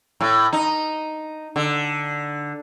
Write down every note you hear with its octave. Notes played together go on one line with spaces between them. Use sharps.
A2
D#4
D3